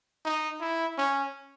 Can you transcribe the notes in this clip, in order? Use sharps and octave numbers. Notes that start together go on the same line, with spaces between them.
D#4
E4
C#4